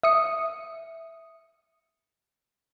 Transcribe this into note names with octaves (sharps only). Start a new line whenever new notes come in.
E5 D#6 C#7